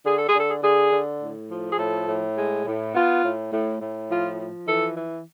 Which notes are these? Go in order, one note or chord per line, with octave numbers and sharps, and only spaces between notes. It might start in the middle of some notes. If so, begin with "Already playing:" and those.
D3 G#4
A4
G#4
D3 A4
G#4
D3 G#4
D3
A2
F3
G#4
A2 A4
A2
G#3
A2
B3 F4
A2
A2
A2
F3 F4
F3
E3 A4
E3